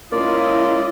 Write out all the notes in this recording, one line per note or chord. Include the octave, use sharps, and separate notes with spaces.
G#3 A#3 C#4 E4 F4 D5 D#5